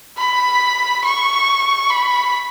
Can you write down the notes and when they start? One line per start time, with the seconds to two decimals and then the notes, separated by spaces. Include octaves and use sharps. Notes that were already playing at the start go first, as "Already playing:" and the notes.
0.17 B5
1.04 C#6
1.90 B5